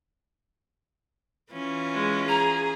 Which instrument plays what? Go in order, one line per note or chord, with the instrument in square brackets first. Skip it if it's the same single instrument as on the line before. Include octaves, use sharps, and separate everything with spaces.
[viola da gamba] E3 C#4 F4
[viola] G#3
[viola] G#4 [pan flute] A#5